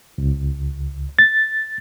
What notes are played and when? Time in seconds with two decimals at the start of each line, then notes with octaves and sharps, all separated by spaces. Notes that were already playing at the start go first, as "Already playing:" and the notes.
0.18 C#2
1.19 A6